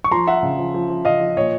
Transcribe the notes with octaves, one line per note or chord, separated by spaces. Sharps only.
C#6
F3 A#5 C6
F3 E5 F#5
C#3
F3
F3
F3
C#3 D#5 F5
F3
A#2 C#5 D#5